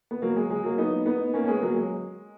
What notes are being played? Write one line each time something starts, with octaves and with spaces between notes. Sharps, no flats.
B3
F#3 A#3
G#3
G#3
F#3 A#3
B3 D#4
B3 D#4
A#3 C#4
C#4
G#3 B3
F#3 A#3
G#3